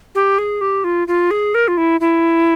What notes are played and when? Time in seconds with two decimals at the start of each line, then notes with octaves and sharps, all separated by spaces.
0.15 G4
0.38 G#4
0.61 G4
0.84 F4
1.08 F4
1.31 G#4
1.54 A#4
1.68 F4
1.77 E4
2.00 E4